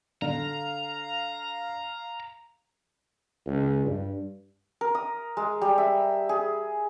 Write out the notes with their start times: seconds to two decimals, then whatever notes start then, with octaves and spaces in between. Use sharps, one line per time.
0.22 D3 F5 A#5
3.46 C#2
3.86 G2
4.81 A#4
4.95 D#6
5.37 G#3
5.61 G3
5.78 E5
6.29 G#4